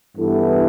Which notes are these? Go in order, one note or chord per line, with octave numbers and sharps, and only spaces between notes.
G2 E3 B3 E4 A4